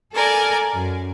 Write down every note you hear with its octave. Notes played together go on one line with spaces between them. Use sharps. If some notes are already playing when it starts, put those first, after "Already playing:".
A4 A#4 D5 G#5
F#2